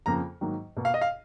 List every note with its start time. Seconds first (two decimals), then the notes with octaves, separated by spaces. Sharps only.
0.06 F2 C#3 F3 A#3 A#5
0.41 G#2 D#3 F#3 A#3
0.77 B2 A#3
0.85 F5
0.94 D#5
1.01 F5